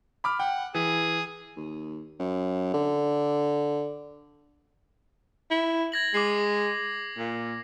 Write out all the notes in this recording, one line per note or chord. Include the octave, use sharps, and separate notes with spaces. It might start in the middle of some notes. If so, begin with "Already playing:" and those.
B5 D6 F6
F#5 G5
E3 G#4
D#2
F#2
D3
E4
G#6 A#6 F#7
G#3 D6 C7
A#2